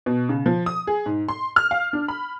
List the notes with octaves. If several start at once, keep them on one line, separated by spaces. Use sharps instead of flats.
B2
C#3
F3
D#6
G#4
G#2
C6
F6
F5
D4
B5